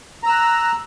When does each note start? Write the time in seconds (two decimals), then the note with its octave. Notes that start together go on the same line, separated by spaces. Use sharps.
0.24 A#5
0.26 E6
0.29 F#6